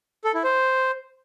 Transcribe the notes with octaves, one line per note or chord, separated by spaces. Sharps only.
A4
E4
C5